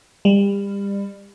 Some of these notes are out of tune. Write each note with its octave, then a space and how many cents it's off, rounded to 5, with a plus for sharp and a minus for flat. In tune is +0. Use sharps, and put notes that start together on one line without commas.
G3 +30